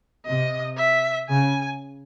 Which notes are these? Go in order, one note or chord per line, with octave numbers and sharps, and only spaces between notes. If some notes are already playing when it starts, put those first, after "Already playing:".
C3 D#5
E5
C#3 G#5